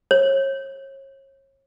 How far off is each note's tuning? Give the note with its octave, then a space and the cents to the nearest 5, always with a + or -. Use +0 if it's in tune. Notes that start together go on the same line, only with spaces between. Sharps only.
C#5 -35